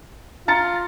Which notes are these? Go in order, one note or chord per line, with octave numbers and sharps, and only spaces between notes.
F4 A#5 A6 C#7